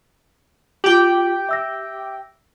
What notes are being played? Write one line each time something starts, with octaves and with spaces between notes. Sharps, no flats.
F4 G4 G5 D7 F#7
E5 E6 A#6